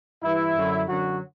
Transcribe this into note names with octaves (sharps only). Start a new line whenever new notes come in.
G2 E3 E4
F#2 D3 F#3
F#2 D3 F#3 F#4